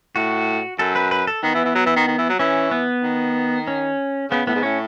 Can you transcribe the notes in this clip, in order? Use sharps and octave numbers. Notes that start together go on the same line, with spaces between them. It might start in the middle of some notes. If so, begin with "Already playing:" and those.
A2 F#4
F#2 A4
B4
B4
A4
D#3 B3
E3
E3
F#3
E3
D#3
D#3
E3
F#3
E3 C#4
B3
D#3
C#4
C#3 B3
A2 B3
G#2
A2 C#4